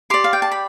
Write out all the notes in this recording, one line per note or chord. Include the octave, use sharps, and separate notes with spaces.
G4 D5 C6
F5
G5
A5
B5